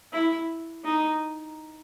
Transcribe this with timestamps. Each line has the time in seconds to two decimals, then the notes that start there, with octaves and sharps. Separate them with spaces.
0.13 E4
0.85 D#4